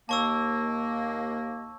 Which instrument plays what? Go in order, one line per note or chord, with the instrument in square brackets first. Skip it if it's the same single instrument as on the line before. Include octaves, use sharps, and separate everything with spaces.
[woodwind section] D#2 A#3 [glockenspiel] A5 C#6 E6